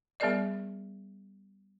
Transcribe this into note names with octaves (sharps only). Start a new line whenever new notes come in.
G3 B3 G#4 A#4 D5 D#5